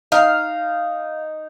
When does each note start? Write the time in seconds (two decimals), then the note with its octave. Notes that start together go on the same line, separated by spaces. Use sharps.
0.12 D#4 F5